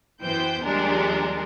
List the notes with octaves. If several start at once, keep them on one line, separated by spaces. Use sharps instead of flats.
F#2 E3 B3 C5 G5 G6
D#2 F3 G3 G#3 D4 A#4